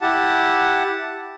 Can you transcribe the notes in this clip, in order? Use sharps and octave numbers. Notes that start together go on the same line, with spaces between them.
E4 G4 F#5 A5